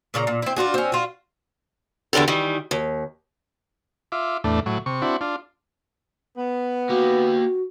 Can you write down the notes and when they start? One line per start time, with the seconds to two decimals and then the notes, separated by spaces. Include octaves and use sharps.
0.14 A#2 C#3 A4 A#5
0.27 A#2
0.42 C4 E4
0.57 D4 F4 F#4 G#4
0.74 C4 C#4
0.92 F4 F#4
2.13 E2 D3 D4 G4 A4
2.28 D#3 E3 G3
2.71 D#2
4.12 F4 E5 D6
4.44 E2 A2 A3 D4
4.66 A2 F#3
4.86 C3 C#6
5.02 C4 D4 E4 F#4
5.21 D4 F4
6.38 B3
6.89 A#3 F#4 G4